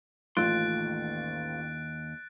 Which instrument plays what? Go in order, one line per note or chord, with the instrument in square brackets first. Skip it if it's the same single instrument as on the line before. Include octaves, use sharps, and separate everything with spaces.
[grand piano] A1 F4 [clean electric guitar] D#2 A4 C6 [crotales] F#6 A6 D7